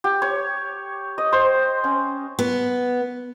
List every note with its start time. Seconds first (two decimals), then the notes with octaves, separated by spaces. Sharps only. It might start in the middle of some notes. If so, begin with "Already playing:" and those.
0.04 G4
0.22 C#5
1.18 D#5
1.33 C5
1.84 C#4
2.39 B3